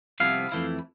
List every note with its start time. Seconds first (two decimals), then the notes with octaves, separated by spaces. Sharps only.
0.20 C2 C3 F3 B3 E4 F5
0.52 F2 E3 A3 E4